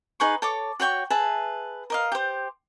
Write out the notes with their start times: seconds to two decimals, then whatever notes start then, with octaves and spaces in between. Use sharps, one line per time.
0.20 D#4 G#4 B4 C#6
0.42 A4 C#5 D6
0.80 F#4 C#5 G5 C#6
1.10 G#4 B4 E5 A5
1.90 A#4 D#5 F5
2.12 G4 C5